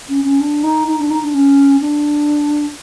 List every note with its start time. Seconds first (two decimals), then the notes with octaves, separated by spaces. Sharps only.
0.09 C#4
0.24 C#4
0.40 D4
0.63 D#4
0.87 D#4
0.99 D4
1.10 D#4
1.23 D4
1.34 C#4
1.81 D4